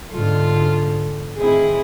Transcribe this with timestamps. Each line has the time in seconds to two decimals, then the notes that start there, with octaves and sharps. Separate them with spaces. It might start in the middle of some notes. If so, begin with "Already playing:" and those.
0.12 G#2 D3 F4 A4
1.37 A2 D#3 C4 E4 G#4